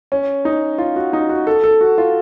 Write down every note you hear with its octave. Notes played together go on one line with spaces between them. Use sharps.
C#4
D#4
F4
F#4
D#4
F#4
A4
A4
F#4
F4